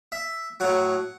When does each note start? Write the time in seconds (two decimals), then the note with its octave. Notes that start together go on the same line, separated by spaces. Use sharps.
0.12 E5
0.60 A2 F#3 F#5